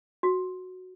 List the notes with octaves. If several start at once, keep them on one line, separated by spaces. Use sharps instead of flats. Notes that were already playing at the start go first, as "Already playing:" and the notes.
F#4